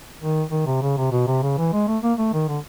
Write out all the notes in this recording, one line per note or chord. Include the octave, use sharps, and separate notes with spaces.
D#3
D#3
C3
C#3
C3
B2
C3
C#3
E3
G#3
A3
A#3
A3
D#3
D3